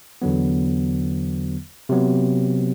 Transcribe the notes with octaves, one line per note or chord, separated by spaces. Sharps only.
E2 D3 F#3 B3
C3 F#3 B3